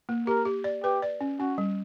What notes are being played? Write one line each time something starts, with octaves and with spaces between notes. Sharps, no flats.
A#3
G4 A#4
G4
D5
G4 B4
D5
C#4
C#4 F#4
G3